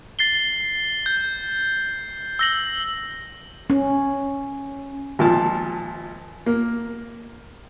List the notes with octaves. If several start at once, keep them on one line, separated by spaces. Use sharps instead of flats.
A6 C7 G7
G6
E6 A#6 F#7
C#4
G#1 A#2 F3 A5
A#3